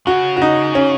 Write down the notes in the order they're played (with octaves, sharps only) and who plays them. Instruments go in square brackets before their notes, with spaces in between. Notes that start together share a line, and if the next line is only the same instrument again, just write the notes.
[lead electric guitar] C#3 [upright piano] F#4
[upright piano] F#4
D#4
C#4